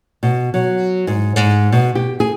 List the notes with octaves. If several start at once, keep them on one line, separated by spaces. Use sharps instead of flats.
B2
F#3
G#2
G#2
B2
G4
G#4